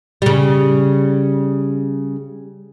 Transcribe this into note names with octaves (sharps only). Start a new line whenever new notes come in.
C#3 G3